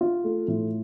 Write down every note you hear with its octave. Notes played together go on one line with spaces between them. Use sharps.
F4
A3
A2